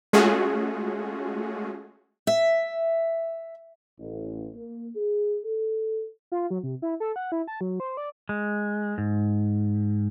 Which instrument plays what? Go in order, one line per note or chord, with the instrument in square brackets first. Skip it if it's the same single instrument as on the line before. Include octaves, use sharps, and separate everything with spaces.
[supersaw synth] G#3 A3 C#4 F4 F#4 G#4
[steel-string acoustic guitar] E5
[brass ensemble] A1
A#3
G#4
A4
[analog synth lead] F4
F#3
C3
E4
A4
F#5
E4
A5
F#3
C5
D5
[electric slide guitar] G#3
G#2